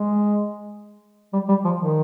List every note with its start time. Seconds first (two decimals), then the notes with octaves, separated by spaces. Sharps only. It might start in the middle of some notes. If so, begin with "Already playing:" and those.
Already playing: G#3
1.33 G3
1.49 G3
1.65 F3
1.80 D#3